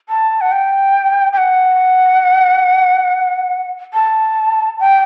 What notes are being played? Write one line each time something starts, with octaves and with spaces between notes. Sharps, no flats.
A5
F#5
G5
G5
F#5
A5
G5